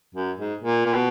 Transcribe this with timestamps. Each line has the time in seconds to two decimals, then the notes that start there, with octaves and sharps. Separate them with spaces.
0.15 F#2
0.38 G#2
0.62 A#2
0.86 A#2
0.94 B2